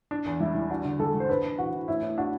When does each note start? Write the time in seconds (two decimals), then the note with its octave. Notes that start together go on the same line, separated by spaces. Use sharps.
0.11 D4
0.26 E2
0.40 G3 E4
0.55 G3
0.70 D4 F#4
0.85 D3
1.00 G3 A4
1.14 G3
1.20 C5
1.29 D4 B4
1.44 D4
1.58 E3 F#4
1.73 E3
1.88 A2 E4
2.02 A2
2.18 D4 F#4